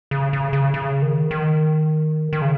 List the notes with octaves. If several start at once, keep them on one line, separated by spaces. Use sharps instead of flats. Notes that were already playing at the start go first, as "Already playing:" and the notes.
C#3
C#3
C#3
C#3
D#3
D#3
D#3
C#3